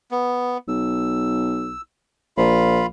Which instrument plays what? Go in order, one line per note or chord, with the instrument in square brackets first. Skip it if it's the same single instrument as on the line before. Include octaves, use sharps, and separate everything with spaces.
[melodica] B3
[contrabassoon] B1 [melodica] E6
[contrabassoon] A#1 [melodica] F4 F5 B5